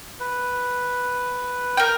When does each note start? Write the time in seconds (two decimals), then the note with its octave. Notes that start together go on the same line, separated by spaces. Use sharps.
0.20 B4
1.77 A#4 G5